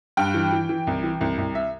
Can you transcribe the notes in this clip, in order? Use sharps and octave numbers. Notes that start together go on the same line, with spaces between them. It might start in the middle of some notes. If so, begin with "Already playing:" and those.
G2 G5
E3
E3
E3
C2
E3
C2
C2
E5